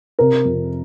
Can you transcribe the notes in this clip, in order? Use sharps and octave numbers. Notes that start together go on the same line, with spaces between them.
C3 A#4
F2